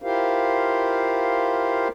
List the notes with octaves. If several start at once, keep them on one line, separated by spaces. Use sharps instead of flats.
E4 F4 G4 A#4 C5 F5